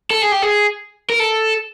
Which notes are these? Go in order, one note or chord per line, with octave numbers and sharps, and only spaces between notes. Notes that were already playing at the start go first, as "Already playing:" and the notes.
A4
G#4
G4
G#4
A#4
A4